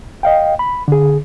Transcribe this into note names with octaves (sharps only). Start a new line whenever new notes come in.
D#5 F5 G5
B5
D3 G#4